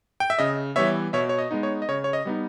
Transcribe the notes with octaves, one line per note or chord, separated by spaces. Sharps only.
G5
E5
C#3 D#5
E3 G3 B3 C#5 E5
B2 C#5 E5
C#5
D#5
G#3 B3 D#4
C#5
D#5
C#3 C#5
C#5
D#5
G3 B3 D#4